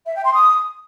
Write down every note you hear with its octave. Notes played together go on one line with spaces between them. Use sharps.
E5
G5
C6
D#6